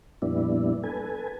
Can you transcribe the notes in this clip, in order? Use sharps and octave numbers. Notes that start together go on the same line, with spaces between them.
F2 A#2 G3 B3 D4 E4
A4 B4 G#5